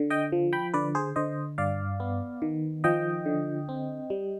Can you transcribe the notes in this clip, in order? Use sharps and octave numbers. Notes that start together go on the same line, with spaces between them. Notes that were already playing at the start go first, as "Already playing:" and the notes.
Already playing: D3
D#5 G5
F3
G5 B5
D3 B4 D5
G#4 C5
D3 C5 D#5
G2 D5 F5
B3
D#3
F3 D#5 G5
D3
C4
G3